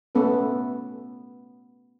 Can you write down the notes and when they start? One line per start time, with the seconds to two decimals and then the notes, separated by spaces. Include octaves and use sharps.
0.15 A3 B3 C#4 A4 B4